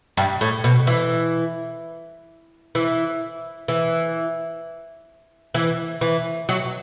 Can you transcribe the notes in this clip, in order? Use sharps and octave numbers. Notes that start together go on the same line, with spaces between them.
G2
A2
B2
E3
E3
E3
E3
E3
F#3